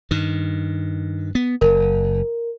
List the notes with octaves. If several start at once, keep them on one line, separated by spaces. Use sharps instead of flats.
G2 D#3
B3
F#1 A#4